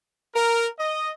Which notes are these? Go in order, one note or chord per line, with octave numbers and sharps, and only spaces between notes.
A#4
D#5